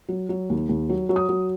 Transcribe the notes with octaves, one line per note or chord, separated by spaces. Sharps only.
F#3
F#3
D#2
D#2
F#3
F#3
D#6
F#3